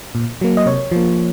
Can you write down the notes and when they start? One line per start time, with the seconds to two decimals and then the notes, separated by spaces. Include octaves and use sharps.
0.15 A#2
0.41 F#3 A#3
0.57 D#5
0.66 C3 C#5
0.92 F3 A#3